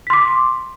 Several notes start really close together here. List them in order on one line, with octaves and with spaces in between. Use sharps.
B6 C6 D6